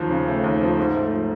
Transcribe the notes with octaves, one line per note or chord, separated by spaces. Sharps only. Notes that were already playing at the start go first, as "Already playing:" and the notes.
Already playing: D#2 F3
C#3
A3
D#2
F3
G#2
A3
F3